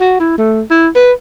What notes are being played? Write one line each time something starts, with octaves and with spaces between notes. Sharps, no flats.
F#4
E4
A3
E4
B4